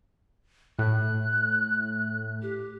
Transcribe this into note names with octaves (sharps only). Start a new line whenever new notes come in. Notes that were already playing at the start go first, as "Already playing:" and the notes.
A2 F#6
G4